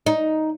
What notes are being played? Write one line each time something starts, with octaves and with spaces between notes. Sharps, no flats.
D#4